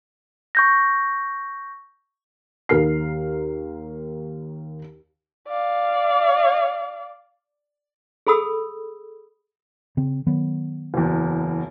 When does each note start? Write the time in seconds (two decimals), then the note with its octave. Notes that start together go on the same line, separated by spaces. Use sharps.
0.55 C#6 G6 A#6
2.69 D#2 A#4 F6 C7
5.48 D5 F5
8.27 G#4 A4 B5 D#6 E6
9.97 C#3 C4
10.26 D#3 F#3 B3
10.94 F#1 E2